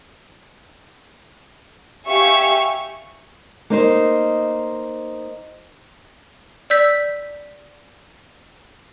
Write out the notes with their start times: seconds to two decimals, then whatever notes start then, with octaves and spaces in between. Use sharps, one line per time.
2.06 G4 E5 F5 G#5 C#6
3.70 A#3 D#4 C5
6.70 D5 E6 G6 B6